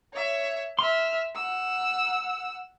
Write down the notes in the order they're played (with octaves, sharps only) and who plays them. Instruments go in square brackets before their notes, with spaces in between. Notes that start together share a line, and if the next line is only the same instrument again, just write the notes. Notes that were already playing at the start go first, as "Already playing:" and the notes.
[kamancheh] C#5 E5
[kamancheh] E5 F6 [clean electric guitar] C6
[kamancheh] F#5 E6